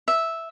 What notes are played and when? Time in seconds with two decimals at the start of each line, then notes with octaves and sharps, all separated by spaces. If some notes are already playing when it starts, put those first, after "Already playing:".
0.08 E5